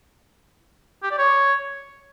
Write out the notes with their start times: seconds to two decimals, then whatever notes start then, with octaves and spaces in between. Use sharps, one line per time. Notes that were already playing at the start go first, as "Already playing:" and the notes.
1.03 G4
1.11 D5
1.18 C#5